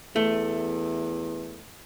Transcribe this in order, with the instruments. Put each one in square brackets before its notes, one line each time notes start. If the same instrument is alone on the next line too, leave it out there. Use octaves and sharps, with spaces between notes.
[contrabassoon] E2 [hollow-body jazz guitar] A3